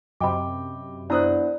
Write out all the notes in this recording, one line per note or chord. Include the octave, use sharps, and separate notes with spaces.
F#2 C3 D#5 G5 B5 D6
B3 D4 E4 C5 D5 A#5 D#6 F#6